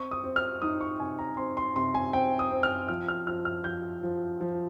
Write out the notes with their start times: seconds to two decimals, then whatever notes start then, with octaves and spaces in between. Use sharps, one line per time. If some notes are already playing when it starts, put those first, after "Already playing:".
Already playing: C4 C#6
0.11 D#6
0.24 C4
0.36 F6
0.62 D#4 D#6
0.81 C#6
1.00 C3 G#5
1.19 A#5
1.37 C4 C6
1.57 C6
1.76 C3 C6
1.94 G#5
2.13 C4 G5
2.39 D#6
2.51 C4
2.63 F6
2.88 F3 F6
3.08 F6
3.27 F3 F6
3.45 F6
3.64 F3 G6
4.03 F3
4.41 F3